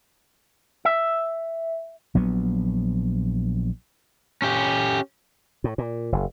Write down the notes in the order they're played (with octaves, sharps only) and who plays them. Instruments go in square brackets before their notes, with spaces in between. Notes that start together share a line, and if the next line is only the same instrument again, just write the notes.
[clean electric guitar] E5
[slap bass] A#1 F#3 B3
[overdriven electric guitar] C#4 G4
[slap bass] A2
A#2
F#1